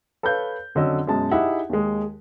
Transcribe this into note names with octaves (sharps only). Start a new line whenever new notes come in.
A4 B4 C#5 F5 G6
F2 D3 F#3 C#4 D#5 E6
F#2 B2 G#3 A5
D#4 E4 G4 G#4 E5 F#5
D#2 G#3